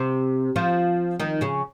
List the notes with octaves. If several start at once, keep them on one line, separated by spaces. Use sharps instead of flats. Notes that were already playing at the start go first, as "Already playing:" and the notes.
Already playing: C3 C4
F3 F4
D#3 D#4
C#3 C#4